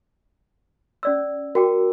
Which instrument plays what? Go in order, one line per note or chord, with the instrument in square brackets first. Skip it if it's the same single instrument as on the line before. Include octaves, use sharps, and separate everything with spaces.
[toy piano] C#4 D5 E6
[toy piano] F#4 G5 D6 [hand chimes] A#4